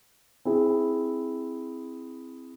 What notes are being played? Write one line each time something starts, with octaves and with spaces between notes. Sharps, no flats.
C4 E4 G#4